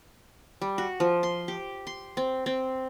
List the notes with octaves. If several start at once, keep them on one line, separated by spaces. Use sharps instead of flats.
G3
F#4
F3
C6
G4
C6
C4
C4